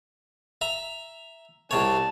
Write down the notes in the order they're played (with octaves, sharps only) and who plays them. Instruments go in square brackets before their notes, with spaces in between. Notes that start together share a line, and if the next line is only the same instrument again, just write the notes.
[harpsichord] E5 A#5
[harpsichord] C2 C3 C#5 [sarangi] A5